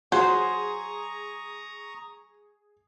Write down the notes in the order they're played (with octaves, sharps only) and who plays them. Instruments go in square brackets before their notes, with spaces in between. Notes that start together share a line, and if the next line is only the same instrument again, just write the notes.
[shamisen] F#3 [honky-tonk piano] G#4 [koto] C5 [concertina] A#5 C#6 D#6